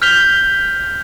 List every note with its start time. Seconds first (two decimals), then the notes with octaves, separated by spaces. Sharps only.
0.02 F6 G6 B6 F7 G7